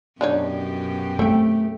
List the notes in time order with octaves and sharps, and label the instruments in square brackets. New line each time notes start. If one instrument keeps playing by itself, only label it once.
[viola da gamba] F#2 B2 G4 [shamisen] D4 D#4 C#5
[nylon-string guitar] A3 [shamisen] C4 G5